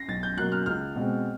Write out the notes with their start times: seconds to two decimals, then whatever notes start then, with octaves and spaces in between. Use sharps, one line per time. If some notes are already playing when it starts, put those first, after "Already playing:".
Already playing: A#6 C7
0.08 B1 A6
0.23 G6
0.37 B2 F#3 A#3 F#6
0.52 F6
0.66 C#2 F6
0.96 B2 G#3 C4